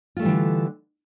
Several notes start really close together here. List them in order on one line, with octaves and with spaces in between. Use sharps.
F4 A3 G3 E3 D3